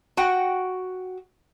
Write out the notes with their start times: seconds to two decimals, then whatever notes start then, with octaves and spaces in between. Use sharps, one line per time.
0.17 F#4 F#5 G5